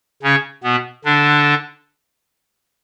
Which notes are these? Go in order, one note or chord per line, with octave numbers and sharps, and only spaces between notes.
C#3 C#4
B2 B3
D3 D4